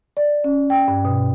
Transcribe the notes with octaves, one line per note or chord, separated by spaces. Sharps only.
D5
C#4
G5
G2
B2